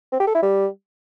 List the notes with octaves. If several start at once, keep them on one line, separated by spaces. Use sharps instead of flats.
C4
G4
A4
E4
G3